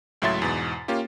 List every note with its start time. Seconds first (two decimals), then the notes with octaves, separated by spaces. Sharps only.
0.22 C#2 A2 F#3 E5 C6 A6
0.42 E2 G#2 B2
0.88 A#3 C#4 F4 G4